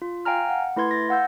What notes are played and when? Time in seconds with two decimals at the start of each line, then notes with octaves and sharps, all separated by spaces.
0.02 F4
0.25 F5 G5 G#5 A#5 F6
0.49 F#5
0.76 A3 E4 B4 C6 G#6
0.91 A6 A#6
1.09 F5 F#5 E6 G6